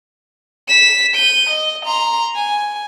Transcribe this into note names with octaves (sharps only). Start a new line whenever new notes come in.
B6 E7
G6 D#7
D#5
A#5 C6
G#5